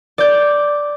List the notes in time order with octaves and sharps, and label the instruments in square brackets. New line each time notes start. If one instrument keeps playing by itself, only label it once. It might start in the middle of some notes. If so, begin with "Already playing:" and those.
[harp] D5 G6